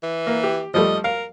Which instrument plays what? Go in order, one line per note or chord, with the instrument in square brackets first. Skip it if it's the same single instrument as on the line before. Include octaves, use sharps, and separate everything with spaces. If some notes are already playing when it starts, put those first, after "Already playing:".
[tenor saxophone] E3
[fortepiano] A#3
G4
[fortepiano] F3 G3 A3 [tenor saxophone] D#5
[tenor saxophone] A#4 [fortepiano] F5